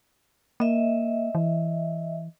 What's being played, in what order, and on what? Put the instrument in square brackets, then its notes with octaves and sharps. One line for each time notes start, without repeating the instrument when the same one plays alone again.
[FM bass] A#3 [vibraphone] D#5 E5
[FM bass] E3